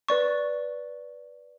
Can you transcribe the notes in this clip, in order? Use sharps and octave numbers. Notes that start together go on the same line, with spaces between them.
B4 D5 C#6